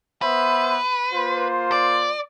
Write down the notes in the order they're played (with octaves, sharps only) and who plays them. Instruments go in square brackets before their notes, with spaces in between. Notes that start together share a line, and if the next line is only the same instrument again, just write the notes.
[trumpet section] B3 C5 E5 [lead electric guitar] B4
[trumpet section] A#3 F4 C5
[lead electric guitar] D5